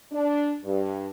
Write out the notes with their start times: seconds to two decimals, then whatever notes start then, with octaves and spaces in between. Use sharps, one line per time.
0.12 D4
0.64 G2